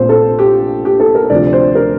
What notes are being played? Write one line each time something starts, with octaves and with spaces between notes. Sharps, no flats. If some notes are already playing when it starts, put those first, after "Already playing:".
Already playing: A#1 A#2 A3 C4 C5
A4
G4
G4
A4
A#4
D2 C3 F3 C4 D5
C5
A#4